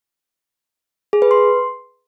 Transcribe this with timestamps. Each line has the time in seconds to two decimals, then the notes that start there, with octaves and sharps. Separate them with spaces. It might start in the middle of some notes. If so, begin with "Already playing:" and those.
1.13 G#4
1.22 B4
1.31 C6